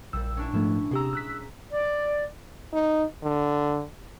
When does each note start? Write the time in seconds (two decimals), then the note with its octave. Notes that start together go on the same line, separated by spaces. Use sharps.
0.13 A#1 A#2 G3 E6
0.37 C#4 D4 E4
0.53 G#2 F3 A3 E4
0.91 C3 G4 G#4 A#5 E6
1.13 E6 F#6 B6
1.72 D5
2.73 D#4
3.24 D3